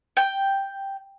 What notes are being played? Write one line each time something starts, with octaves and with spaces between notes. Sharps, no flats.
G5